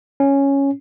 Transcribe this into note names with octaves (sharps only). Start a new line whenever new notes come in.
C#4